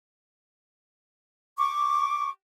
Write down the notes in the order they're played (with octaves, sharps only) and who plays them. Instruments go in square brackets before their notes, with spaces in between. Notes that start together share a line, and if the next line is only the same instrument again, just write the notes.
[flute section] C#6 D6